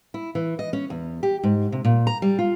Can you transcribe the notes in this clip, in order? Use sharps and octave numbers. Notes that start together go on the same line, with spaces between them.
E4
E3
D#5
C#4
E2
G4
G#2
C3
A#2
A#5
G3
F4